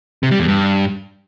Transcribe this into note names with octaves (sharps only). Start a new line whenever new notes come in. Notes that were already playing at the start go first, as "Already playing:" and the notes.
C3
G3
E2
G2